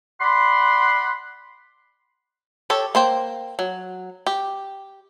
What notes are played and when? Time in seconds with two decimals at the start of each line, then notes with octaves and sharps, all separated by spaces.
0.20 D5 F#5 B5 C6
2.70 G4 A4 C#5
2.95 A#3 C5 G5
3.59 F#3
4.27 G4